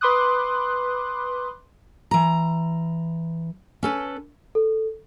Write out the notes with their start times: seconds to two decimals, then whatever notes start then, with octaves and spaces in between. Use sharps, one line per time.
0.01 B4 B5 C6 D6 D#6 F#6
2.11 E3 A#5
3.83 C#4 A4 B4
4.55 A4